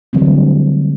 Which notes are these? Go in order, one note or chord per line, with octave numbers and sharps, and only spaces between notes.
D3 E3 F#3 G3 A3 C4